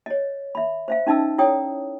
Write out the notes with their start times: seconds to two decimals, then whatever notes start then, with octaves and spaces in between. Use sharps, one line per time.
0.06 C#5 D#5
0.55 E5 B5
0.88 C5 E5 F5
1.07 C#4 D#4 D#5 A5 E6
1.38 E4 A4 C#5 D5 G5 D#6